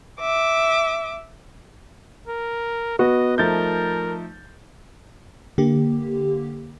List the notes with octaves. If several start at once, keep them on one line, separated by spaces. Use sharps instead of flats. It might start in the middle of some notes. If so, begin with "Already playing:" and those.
E5 D6
A#4
B3 F#4 D#5
F3 A3 D#4 A#4 G6 A6
D3 A#3 G4